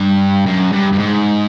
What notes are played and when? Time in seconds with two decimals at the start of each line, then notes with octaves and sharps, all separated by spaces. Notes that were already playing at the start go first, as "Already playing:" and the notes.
Already playing: G2
0.46 F#2
0.72 G2
0.92 G2
0.98 G#2